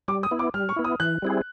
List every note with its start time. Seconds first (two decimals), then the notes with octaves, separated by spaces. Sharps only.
0.08 G3 D6
0.23 D#6
0.31 B3 E4
0.39 D6
0.54 G3 F6
0.69 C#6
0.76 B3 E4
0.84 D#6
1.00 E3 F#6
1.22 G3 C4 E4 G#4